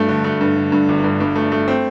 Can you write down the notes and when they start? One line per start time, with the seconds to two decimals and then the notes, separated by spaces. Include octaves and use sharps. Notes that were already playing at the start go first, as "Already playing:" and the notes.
Already playing: G2 A3
0.09 D3
0.24 A3
0.41 G2
0.57 D3
0.72 G2
0.89 G1
1.04 G2
1.20 G2
1.36 A3
1.52 A3
1.68 C4